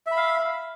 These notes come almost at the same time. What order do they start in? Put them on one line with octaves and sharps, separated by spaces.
E5 B5 F5